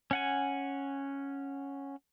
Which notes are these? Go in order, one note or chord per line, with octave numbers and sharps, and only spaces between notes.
C#4 F#5 G#5